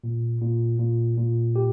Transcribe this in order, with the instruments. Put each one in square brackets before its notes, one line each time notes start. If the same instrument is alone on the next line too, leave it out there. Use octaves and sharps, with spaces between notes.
[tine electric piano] A#2
A#2
A#2
A#2
G4